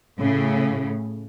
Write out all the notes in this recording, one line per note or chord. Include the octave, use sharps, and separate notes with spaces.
A2 C#3